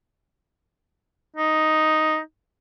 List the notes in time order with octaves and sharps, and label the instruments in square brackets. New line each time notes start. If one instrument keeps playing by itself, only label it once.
[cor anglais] D#4